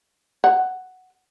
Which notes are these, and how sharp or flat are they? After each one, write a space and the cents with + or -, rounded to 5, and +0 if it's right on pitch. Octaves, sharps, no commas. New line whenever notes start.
F#5 +5